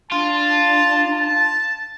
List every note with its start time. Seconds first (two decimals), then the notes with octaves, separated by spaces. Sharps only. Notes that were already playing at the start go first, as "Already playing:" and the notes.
0.12 D4 F4 A5
1.12 A5